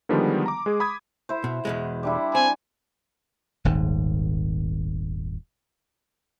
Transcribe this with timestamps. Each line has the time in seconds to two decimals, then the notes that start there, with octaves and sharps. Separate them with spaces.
0.09 D3 D#3 F3 G3 G#3 B3
0.46 A#5 D6
0.66 G#3 G#4
0.80 B5 D#6 G#6
1.29 E4 C5
1.44 B2
1.65 E2 B2 G#3
2.03 G3 D4 E4
2.35 C4 G#5
3.65 D#1 G#1 G#2